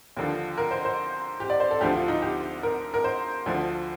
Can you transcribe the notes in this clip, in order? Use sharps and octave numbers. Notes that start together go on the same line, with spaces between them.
D#2 D3 F3
A#4
C5
C5
G4
D5
C5
A4
D2 D3 F3 G4
F4
D#4
G4
A#4
A#4
C5
D2 D3 F3